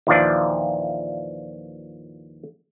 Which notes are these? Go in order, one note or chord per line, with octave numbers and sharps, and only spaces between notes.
D#2 A#2 E3 F3 D4